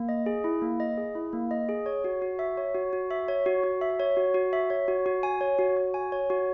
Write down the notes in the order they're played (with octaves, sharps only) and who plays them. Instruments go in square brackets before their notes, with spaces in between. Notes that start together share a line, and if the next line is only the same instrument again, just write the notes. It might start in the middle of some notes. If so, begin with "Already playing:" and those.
Already playing: [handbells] A#3
D#5
G#4
E4
A#3
D#5
G#4
E4
A#3
D#5
G#4
C#5
F#4
F#4
E5
C#5
F#4
F#4
E5
C#5
F#4
F#4
E5
C#5
F#4
F#4
E5
C#5
F#4
F#4
G#5
C#5
F#4
F#4
G#5
C#5
F#4